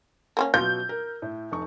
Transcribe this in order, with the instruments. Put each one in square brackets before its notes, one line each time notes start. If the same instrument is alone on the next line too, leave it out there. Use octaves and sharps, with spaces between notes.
[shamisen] A#3 C4 C#4
[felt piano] B2 F#3 [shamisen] F4 [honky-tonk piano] G6
[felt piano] A#4
A2
F1 D#4 C#6